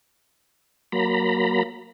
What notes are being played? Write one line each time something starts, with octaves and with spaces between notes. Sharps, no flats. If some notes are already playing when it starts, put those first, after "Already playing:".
F#3 A#3 A#5 B5